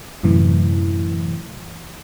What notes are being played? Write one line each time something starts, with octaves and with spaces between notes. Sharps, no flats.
F#2 A2 C3 E3